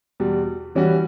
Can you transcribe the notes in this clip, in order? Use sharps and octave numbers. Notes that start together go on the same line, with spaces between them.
E2 B2 G3
E3 G3 C#4 F#4